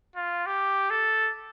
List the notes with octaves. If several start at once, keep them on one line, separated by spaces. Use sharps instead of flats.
F4
G4
A4